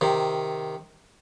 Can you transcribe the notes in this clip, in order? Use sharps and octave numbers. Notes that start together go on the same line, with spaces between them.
C3 D#3